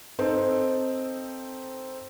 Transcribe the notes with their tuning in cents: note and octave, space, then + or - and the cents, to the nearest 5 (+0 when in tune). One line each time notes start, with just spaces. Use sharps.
C4 +0 D#4 +0 A4 +0